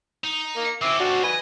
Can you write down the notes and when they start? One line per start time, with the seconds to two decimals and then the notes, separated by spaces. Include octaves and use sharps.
0.24 D#4
0.56 A#3
0.82 C4 C#4 E4 D6 E6
1.00 D4 F#4
1.23 B4 D#5 G#5